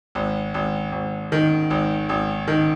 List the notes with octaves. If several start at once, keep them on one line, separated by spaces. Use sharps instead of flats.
G#1
G#1
G#1
D#3
G#1
G#1
D#3